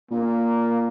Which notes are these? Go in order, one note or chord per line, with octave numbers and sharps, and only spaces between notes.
A#2 A#3